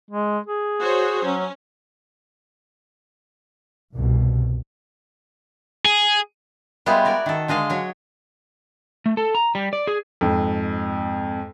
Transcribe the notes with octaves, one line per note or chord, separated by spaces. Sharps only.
G#3
G#4
F#4 C5 C#5
F#3 C#4
C2 G2 B2
G#4
G3 G#3 B3 E4 F4 G4
F#4 A#4 D5
D#3 A4
D3 G#3 D#5 F5
F#3 C#5
A3
A4
A#5
G3
D5
G#4
F2 G#2